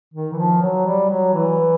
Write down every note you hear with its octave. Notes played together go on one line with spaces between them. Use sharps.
D#3
E3
F3
F#3
G3
F#3
E3